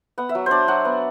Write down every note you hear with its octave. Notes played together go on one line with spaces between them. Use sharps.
B3 F#5
E5
F#3
D4 C5 D5
F#3 F#5
B3